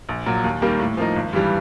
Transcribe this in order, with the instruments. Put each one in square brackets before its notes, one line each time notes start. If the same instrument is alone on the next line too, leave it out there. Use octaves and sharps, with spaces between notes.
[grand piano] A#1
A#2 F#3
D#2
D#3 G3 A#3
A2
F3 A#3 D#4
G#1
G2 E3 G3